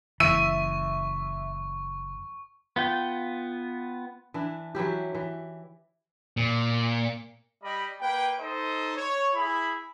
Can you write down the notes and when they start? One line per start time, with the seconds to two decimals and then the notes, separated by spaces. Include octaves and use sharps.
0.20 F#1 E3 E5 C#6 D#7
2.76 B3 F4 G5
4.34 E3 D4 E4
4.75 E3 F#3 E4 G4
5.15 E3
6.37 A#2
7.63 G3 G4 D#5 B5
8.01 A#3 B4 G5
8.40 D#4 A4 C5 D#5
8.97 C#5
9.35 E4 G#4 B5